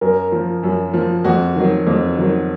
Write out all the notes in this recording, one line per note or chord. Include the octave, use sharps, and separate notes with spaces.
F#2 A#4
F3
F#2
F3
F2 F#4
D#3 F#3
F2
D#3 F#3